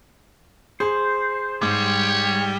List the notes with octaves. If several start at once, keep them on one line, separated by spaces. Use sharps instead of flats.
G#4 C5
G#2 G3 C#5